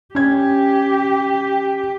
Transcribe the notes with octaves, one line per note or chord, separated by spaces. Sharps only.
C#4 G4 G#6